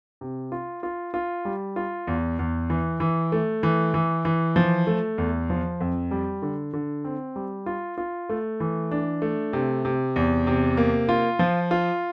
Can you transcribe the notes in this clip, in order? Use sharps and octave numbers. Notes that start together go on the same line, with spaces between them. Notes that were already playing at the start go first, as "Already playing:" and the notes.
C3
F4
F4
F4
G3
F4
E2
E2
E3
E3
A3
E3
E3
E3
F3
A3
E2
F3
F2
G3
D3
D3
C4
G3
F4
F4
A3
E3
D4
A3
C3
C3
E2
C3
A#3
F4
F3
F4